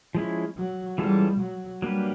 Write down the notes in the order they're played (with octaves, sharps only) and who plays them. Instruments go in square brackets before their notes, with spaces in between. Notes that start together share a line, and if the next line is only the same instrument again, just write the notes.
[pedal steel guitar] F3 G#3 C#4 E4
[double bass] F#3
[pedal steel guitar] E3 G#3 C#4 F4 A4 [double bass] G3
[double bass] F#3
[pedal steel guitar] F#3 A#3 D4 G4 B4 [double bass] G3